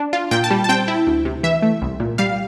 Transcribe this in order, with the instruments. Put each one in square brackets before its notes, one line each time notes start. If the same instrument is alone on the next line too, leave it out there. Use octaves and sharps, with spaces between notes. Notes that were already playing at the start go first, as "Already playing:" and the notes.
Already playing: [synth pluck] D4
F4
A#2 G5
A5
G3
A5
C4 G5
E4
D2
C3
E3 E5
A3
C2
A#2
G3 F5